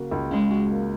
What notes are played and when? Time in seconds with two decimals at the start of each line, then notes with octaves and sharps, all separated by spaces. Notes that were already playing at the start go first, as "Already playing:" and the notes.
Already playing: C#3 A#3 F#4
0.11 C#2
0.31 C#3 G#3
0.50 F#4
0.71 A#3